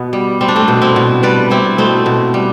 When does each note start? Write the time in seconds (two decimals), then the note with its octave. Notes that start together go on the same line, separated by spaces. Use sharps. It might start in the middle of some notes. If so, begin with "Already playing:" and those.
Already playing: B2 B3
0.13 G3
0.41 G3 C4
0.48 D4
0.56 A3 C4
0.68 B2
0.82 C4 E4
0.96 B2
1.23 G3 B4 D5
1.50 G3 C4 E4
1.78 B2 A3 C4
2.06 B2
2.34 G3